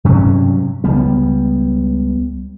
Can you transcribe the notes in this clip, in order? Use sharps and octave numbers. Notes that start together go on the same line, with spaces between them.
G2 C3 F#3 C#4
C#2 G3 B3